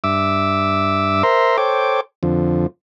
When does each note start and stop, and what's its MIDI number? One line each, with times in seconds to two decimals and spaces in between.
0.04 1.23 43
0.04 1.23 76
0.04 1.23 86
0.04 1.23 88
1.23 1.57 70
1.23 1.57 72
1.23 1.57 76
1.23 1.57 82
1.23 1.57 84
1.58 2.01 69
1.58 2.01 72
1.58 2.01 73
1.58 2.01 79
1.58 2.01 86
2.23 2.67 41
2.23 2.67 50
2.23 2.67 53